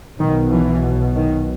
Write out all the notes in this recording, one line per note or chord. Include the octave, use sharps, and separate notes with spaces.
B1 B2 D#3
E3
D#3